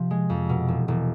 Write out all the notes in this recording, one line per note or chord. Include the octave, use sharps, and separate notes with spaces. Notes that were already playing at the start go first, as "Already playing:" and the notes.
Already playing: C3 F3
G#3
F2
B2
E1
E1